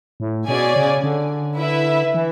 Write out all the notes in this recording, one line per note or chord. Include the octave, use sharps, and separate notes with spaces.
A2
B2 C#4 G#4 D5 G#5
C#3
D3
E4 B4 E5
E3